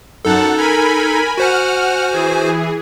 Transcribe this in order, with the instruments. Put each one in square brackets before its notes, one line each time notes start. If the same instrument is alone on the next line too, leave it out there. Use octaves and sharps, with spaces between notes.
[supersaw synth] F#2 F#5 A5 [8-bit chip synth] D#4 A4
[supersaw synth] A#4 G#5 B5
[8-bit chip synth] F#4 C5 G#5 [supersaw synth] F#5 F6
[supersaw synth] E3 G#4